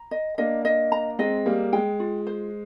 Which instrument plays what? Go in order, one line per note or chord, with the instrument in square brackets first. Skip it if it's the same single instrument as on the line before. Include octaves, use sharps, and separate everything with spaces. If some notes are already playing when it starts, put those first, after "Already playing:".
Already playing: [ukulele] A#5
D#5
[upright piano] A#3 D4 [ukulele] D#5
[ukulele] D#5
A#5
[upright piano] G#3 C4 [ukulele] D#5
[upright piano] G3 A#3 [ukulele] G#4
[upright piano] G#3 [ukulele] G5
[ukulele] F4
C5